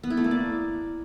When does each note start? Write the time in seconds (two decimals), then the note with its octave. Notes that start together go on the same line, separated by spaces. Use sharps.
0.03 B3
0.10 E4
0.17 A3
0.24 A#3
0.31 D5